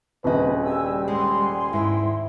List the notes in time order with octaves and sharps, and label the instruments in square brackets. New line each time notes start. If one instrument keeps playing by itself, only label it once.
[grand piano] D#1 C#3 D#5 [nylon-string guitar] D4 F#4 [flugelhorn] B4
[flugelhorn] G3 [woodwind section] G#5 E6
[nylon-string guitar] G#3 [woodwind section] F#5 G#5 C6
[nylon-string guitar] G#2 A#4 G5 [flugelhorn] E4